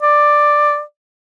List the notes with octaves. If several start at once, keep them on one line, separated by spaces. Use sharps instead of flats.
D5